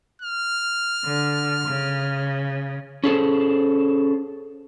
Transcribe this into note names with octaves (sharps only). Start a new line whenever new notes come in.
F6
D3
C#3
C#4 G#4 A4 C5